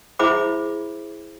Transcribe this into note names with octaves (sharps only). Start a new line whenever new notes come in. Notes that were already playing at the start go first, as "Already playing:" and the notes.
E4 G#4 C5 E5 B5 D6